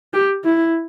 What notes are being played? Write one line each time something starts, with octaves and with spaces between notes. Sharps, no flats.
G4
E4